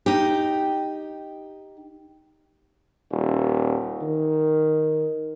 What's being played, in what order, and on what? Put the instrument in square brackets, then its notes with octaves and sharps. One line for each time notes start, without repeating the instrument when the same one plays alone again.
[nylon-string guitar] D#4 G4
[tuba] D#1
D#3